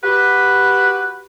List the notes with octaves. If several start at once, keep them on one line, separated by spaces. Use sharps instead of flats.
F#4 G4 B4